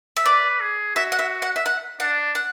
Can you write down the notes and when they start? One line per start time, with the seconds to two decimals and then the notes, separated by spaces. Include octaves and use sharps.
0.17 E5
0.26 B4 D5
0.61 G#4
0.96 F#4 E5
1.12 F#5
1.19 E5
1.42 F#5
1.56 E5
1.66 F#5
2.00 D4 F#5
2.35 F#5